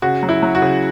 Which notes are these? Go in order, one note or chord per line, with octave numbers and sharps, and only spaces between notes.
C#3 F#4
F#3
E4
F#3
F#4
C#3